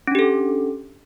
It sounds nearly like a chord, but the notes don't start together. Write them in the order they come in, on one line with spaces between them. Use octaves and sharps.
C#4 D4 G4 A4